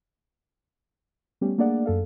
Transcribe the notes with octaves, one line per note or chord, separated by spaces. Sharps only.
G3 A3 B3 C#4 G4
A3 A#3 D4 G#4 D5 F#5
F#2 A4 F5